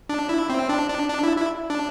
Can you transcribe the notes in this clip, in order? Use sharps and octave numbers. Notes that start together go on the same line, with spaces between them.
D4
E4
C4
D4
D4
D4
E4
E4
D4